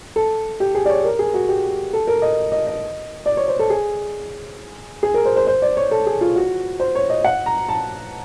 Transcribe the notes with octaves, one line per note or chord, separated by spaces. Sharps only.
A4
G4
G#4
D5
C#5
A#4
G#4
F#4
G4
A4
A#4
D#5
D#5
D#5
D5
C#5
C5
A4
G#4
G#4
A#4
C5
C5
C5
D5
C#5
A4
G#4
F4
F#4
C5
C#5
D#5
F#5
A#5
A5